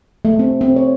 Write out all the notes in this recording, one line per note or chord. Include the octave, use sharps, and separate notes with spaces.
A3
C4
C4
C#5